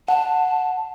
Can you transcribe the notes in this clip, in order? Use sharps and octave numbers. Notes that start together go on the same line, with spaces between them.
F#5 A5